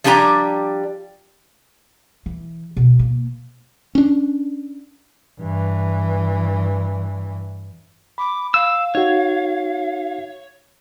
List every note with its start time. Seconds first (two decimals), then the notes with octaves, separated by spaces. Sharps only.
0.04 F3 G3 D4 G4 G#5 A#5
2.26 E3
2.77 B2
2.99 A#3
3.95 C#4 D4
5.39 G2 E3
8.18 B5 D6
8.54 F5 E6
8.95 D#4 F#4 C#5